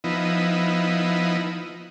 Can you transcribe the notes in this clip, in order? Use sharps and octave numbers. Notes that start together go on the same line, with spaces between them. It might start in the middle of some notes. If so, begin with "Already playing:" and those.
F3 B3 D#4 E4